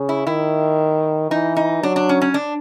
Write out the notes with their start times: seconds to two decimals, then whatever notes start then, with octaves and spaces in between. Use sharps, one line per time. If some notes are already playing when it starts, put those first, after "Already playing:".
Already playing: C#3
0.09 E4
0.27 D#3 E4
1.30 E3 D#4
1.57 D#4
1.82 F#3 D4
1.96 D4
2.09 C#4
2.21 C#4
2.34 D4